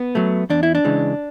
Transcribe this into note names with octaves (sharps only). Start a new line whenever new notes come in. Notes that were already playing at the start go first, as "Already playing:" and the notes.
Already playing: B3
F#3 A3
E2 D4
E4
D4
C#3 E3 G#3